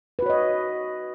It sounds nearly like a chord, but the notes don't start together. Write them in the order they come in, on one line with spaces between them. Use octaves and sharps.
B4 F#4 C#5 D#5